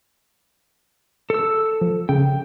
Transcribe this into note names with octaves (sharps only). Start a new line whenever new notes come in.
A4 E6
F3
C#3 G5